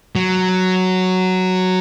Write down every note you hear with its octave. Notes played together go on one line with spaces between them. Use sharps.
F#3